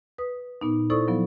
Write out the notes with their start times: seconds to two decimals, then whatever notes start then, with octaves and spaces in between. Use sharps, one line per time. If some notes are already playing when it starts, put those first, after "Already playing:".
0.18 B4 D#6
0.61 A#2 B3 D#4
0.90 E4 A4 C5 D5 C#6 D#6
1.08 F3 F#3 B3